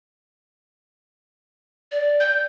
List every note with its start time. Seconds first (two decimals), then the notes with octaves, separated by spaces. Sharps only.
1.92 D5
2.20 G6